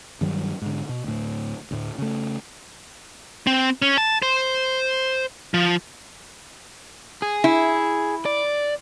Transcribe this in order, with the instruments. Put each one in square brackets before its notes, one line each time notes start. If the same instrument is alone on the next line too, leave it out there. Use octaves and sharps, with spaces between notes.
[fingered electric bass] G2 D#3 F#3 G3
G#2 D3
B2
D2 A2
D2 A2
C#3 A3
[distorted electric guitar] C4
C#4
A5
C5
F3
[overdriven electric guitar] G#4
[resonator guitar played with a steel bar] E4
[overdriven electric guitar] D5